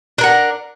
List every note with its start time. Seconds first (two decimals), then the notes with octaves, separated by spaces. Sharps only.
0.18 D4
0.21 A#4
0.24 F#5